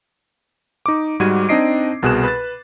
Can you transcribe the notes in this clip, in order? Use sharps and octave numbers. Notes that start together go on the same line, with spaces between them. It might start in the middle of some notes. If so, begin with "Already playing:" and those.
D#4 D6
G#2 G3 F#4 G#6 D#7
C4 D4 D#4 D#5 C7 D7
C2 B2 G#4 F#6 E7
B4 A6